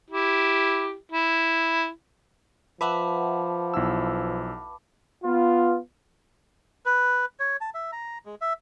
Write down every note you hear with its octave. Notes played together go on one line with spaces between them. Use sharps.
E4 G4
E4
F3 B4 E5 F#5 A5 B5 D6
B1 E4 E6
B3 F4
B4
C#5
A5
E5
A#5
G#3
E5